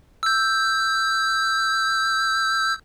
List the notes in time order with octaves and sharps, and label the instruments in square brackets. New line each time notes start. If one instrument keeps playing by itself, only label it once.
[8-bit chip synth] E6 G6